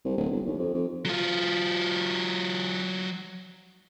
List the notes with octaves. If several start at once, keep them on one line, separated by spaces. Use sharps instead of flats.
C2
D1
G1
D#2
F2
F2
F#3 F4